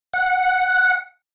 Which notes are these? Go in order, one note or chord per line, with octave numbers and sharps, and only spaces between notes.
F#5